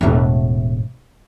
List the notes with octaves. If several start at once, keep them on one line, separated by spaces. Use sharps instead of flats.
E1 A2